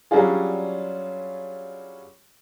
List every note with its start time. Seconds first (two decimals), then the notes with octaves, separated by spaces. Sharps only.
0.11 F#3 G3 C#4 D4 F4 G#4